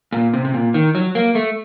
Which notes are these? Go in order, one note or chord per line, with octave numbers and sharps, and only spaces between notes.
A#2
C3
C3
A#2
D#3
F#3
A#3
A3